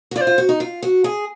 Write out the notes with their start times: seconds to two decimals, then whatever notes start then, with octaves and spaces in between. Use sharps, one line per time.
0.11 F#4
0.16 F4 D5
0.21 C5
0.27 F4
0.38 F#4
0.49 D#4
0.60 F4
0.82 F#4
1.04 G#4